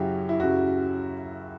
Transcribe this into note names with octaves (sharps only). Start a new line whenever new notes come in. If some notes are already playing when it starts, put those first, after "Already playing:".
Already playing: F#2 C#3 F#3 C#4 E4 G4
E4
F#2 C#3 F#3 C#4 F#4